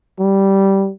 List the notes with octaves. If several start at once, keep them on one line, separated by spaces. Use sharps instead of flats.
G3